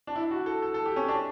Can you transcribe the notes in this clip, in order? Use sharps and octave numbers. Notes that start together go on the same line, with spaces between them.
D4
E4
F#4
A4
A4
A4
G4
C#4
D4